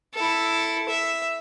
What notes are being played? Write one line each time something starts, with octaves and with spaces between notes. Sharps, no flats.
E4 A4
E5